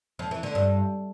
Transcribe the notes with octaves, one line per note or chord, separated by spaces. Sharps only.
F2
E3
D3
G2